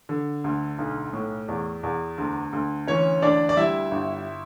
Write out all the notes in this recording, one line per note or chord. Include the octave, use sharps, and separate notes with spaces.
D3
D2
B1
A2
E2
E2
D2
D2
E3 C#4 C#5
D2 D4 D5
D5
G3 E4 E5
G1